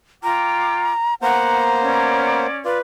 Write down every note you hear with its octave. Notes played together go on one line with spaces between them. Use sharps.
F4 G5 A#5 D6
A#3 B3 C5 F#5 A#5
C#4 C#5 D5
F4 B4 D5